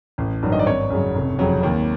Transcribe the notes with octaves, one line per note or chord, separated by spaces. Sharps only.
A1
G2 D#3 F#3
D#5
D5
G#1 C#5
F#2 C#3 F#3
F1
F2 C#3 F#3
D#2